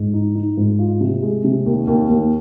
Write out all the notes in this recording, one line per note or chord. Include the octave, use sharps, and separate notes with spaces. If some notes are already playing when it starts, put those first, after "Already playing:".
Already playing: G#2
D#4
D#4
G#2
F4
C3
G#3
C3
D#2
D#2
D#2